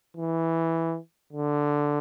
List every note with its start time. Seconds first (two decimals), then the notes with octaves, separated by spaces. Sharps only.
0.17 E3
1.33 D3